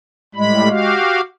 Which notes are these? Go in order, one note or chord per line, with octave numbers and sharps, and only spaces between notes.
A2 G3 G#3 B5
F#4 G4 F5